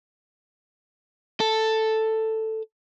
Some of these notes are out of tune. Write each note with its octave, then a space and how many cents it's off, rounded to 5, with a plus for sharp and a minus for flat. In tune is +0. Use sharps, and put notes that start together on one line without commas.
A4 +5